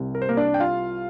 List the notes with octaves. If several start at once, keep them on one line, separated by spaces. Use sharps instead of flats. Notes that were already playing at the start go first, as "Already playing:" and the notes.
Already playing: C2 C3
A#4
C5
A#3 A#4
D4 D5
G5
F4 F5